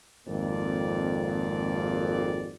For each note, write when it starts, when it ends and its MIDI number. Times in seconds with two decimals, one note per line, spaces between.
0.28 2.55 32
0.28 2.55 41
0.28 2.55 58
0.28 2.55 74